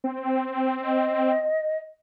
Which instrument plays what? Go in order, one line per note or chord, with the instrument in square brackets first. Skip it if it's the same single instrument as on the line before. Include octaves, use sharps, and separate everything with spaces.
[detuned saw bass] C4
[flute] D#5